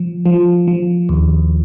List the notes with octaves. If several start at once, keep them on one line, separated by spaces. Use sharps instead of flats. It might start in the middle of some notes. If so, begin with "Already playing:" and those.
Already playing: F3
F3
F3
D#2